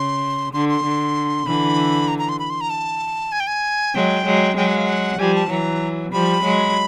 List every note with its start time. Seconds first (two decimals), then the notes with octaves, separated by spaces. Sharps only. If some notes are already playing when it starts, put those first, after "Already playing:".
Already playing: C#3 C6
0.53 D3 C6
0.69 C6
0.84 D3
1.46 D3 E3 B5
2.08 A#5
2.19 A#5
2.29 C6
2.39 B5
2.50 C6
2.61 A#5
2.70 A5
3.32 G#5
3.40 G5
3.47 G#5
3.95 F#3 G#3 G5
4.25 F#3 G#3
4.57 F#3 G#3 G5
4.67 F#5
4.77 F5
4.86 F#5
5.19 F3 G3 G#5
5.35 A5
5.50 E3 F#3 A#5
6.12 F3 G3 B5
6.43 F#3 G#3